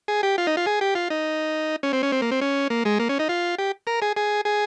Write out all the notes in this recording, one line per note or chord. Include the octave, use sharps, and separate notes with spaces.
G#4
G4
F4
D#4
F4
G#4
G4
F4
D#4
C#4
C4
C#4
C4
A#3
C4
C#4
A#3
G#3
A#3
C#4
D#4
F4
G4
A#4
G#4
G#4
G#4